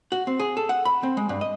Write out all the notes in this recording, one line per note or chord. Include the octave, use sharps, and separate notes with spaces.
F#4
C4
G#4
A4
F#5
B5
C4
G#3
G2
D#5